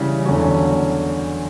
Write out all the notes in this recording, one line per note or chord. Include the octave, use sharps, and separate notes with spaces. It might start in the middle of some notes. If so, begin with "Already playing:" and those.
Already playing: C#3 E3 G3
E2 D3 F#3 C#4